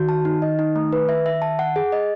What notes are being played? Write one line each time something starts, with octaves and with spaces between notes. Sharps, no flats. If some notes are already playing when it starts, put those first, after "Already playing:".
Already playing: D#3 F#4
A5
D#4
D#5
D#4
A3
B4
E5
E5
A5
F#5
G#4
D#5